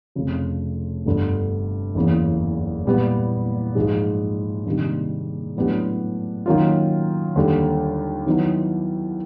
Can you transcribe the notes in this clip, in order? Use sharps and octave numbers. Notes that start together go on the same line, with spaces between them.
F1 F2 C#3 F3
G1 G2 D3
F#1 E2 C#3
A#2 G3 B3
G#2 F3 G#3
C3 D#3 G3 A#3 D4
A2 F#3 B3 D4 G4
D#3 F#3 A#3 C#4 F4
D#2 D3 G3
D#3 F#3 B3 E4